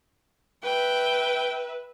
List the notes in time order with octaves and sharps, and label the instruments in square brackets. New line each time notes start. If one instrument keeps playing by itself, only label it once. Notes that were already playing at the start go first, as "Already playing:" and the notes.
[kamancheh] B4 E5 [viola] G5